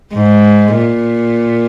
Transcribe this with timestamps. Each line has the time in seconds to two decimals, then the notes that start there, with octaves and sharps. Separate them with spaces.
0.14 G#2
0.76 A#2